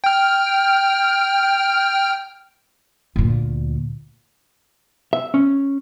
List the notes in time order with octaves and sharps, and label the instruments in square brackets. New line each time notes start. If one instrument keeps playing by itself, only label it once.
[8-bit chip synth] G5 F6
[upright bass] D2 A#2
[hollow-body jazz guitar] E5
C#4